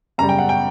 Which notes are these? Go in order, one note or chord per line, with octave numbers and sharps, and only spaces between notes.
F#2 C#3 G3 A#5
G5
F#5
G5